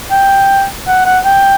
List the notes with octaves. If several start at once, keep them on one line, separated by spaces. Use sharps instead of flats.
G5
F#5
F#5
G5